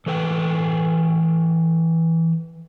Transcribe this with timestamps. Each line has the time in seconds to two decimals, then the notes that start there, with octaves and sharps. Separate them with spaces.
0.06 E3 A4 B4 G5